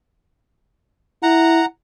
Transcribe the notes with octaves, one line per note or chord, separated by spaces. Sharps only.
E4 F#5 A#5